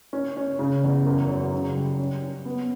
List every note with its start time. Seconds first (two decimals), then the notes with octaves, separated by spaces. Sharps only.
0.13 C#4
0.37 C#4
0.59 C#3
0.83 E2
1.06 F#2
1.29 F#3
1.53 C#3
1.76 G3
1.99 C#4
2.23 C#4
2.45 B3